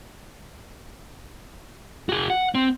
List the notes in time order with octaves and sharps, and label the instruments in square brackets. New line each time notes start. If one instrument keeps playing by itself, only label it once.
[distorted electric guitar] F#4 G#4
F#5
C4